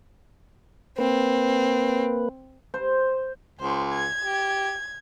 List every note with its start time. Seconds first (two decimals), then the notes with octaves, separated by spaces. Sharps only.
0.98 A#3 C4 B4
2.74 C5
3.59 C#2 C5
3.93 G#6
4.24 G4